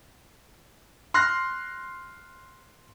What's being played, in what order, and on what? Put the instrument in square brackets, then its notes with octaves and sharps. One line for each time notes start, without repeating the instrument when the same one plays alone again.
[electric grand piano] C6 F6 F#6 A#6